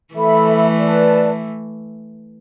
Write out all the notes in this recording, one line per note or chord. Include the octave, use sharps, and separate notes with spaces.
E3 A3 A4 E5 B5
B4 D5 A5